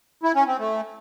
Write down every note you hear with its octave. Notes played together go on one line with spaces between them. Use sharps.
E4
C#4
C4
A3